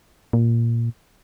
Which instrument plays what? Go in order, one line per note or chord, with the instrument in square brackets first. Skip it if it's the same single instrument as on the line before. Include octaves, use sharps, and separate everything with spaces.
[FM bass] A#2